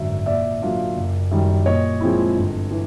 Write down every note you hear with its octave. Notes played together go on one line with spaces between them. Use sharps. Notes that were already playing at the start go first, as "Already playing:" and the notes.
Already playing: G#1 F#2 D3 E5
A#2 D5 E5
F#3 A#3 D4 F4
F#1
F#2 D#3 G3
A#2 C#5 D#5
F3 G#3 C4 E4
G1
E3